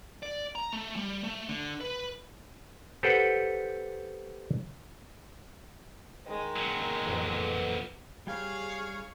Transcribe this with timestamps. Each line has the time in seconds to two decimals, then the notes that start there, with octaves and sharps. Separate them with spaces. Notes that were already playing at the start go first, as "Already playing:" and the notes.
0.23 D5
0.55 A#5
0.73 A3
0.96 G3
1.24 A3
1.49 D3
1.81 B4
3.03 G4 A4 B4 C5 F#5 G5
6.27 D#3 G#3
6.56 A#2 F#3
7.05 A1 F2 B4
8.27 G3 G4 G#4 C#5 F5 G#5